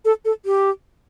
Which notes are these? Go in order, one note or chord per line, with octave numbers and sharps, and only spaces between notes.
A4
A4
G4